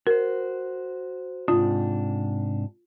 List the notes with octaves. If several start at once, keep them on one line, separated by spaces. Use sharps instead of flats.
F#4 A#4 C5
G#2 C3 D4 F4